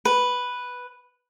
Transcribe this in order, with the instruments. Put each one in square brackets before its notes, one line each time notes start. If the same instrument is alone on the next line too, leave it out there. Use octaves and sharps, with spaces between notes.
[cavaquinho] B4